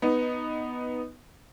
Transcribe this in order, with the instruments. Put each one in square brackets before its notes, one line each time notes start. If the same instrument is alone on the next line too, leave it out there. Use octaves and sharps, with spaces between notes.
[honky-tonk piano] B3 D#4